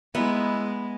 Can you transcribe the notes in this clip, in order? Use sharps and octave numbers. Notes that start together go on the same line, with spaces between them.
G#3 B3 D#4 E4